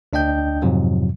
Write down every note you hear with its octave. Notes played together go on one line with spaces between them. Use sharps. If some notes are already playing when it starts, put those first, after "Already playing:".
D2 D4 D#5 G5 G6
F2 G#2 C3 F3 F#3